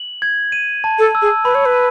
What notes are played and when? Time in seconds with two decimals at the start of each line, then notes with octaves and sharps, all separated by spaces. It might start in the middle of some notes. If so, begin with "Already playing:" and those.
Already playing: F#7
0.22 G#6
0.52 D#7
0.84 A5
0.99 A4
1.15 E6
1.22 G#4
1.45 B4 B5
1.55 C#5
1.66 B4